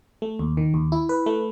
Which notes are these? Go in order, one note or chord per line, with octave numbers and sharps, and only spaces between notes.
A3
D#2
D#3
D#2
E4
B4
A3